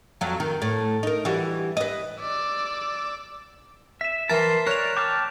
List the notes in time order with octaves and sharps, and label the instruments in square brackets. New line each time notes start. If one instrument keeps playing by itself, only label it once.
[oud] F2 F#3
D#3
A2
D#4 A#4
E3 G3 F#4
B4 D#5
[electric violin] D5 E6
[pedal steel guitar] E5 [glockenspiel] B6 E7
[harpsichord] E3 A#4 [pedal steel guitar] A5 C6
[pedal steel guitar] A#4 D5 [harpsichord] C#5 [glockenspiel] F#6 F7
[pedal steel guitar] G5 A5 F6 [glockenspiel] D6